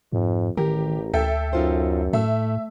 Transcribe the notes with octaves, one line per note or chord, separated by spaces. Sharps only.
F2 G#2
A1 D#3 G4 A#4
D2 A4 E5 G5
F#2 D#4 F4 C5
A2 A3 E5